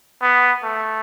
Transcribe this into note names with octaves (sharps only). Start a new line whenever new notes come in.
B3
A3